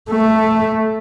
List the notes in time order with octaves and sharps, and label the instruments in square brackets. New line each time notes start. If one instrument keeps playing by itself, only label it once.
[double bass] A3